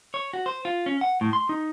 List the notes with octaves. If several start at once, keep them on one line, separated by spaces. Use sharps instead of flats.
C#5
F#4
C5
F4
C#4
F#5
A2
C6
D#4